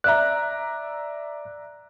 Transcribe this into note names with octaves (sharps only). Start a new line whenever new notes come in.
D5 E5 A#5 F#6